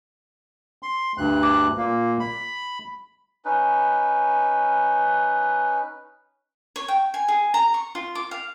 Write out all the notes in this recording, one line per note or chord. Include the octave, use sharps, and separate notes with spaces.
C6
D2 G2 F#6
D6
A#2 A#3
B5
C#4 D#4 B4
C#5
G5
G#5
G#4
A#5
C#6
F4
D6
F5